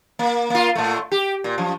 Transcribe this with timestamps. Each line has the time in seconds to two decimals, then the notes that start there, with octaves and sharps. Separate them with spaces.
0.19 A#3
0.50 A#3 F4
0.75 A2 A3
1.12 G4
1.44 A#2
1.58 F#2 F3